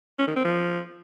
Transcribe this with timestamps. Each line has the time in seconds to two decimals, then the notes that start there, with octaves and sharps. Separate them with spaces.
0.19 C#4
0.27 D#3
0.36 C4
0.45 F3